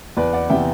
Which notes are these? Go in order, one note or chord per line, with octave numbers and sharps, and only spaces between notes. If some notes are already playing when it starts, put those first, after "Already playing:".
E2 B4 D5
D5 F#5
C3 E3 B3 E5 G5